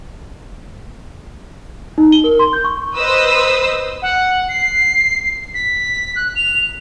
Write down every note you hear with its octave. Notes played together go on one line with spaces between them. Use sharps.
D#4
G7
A#4
C6
G6
C#6
B4 C5 D#5 D#6 E6
F#5
C7
B6
F#6
F7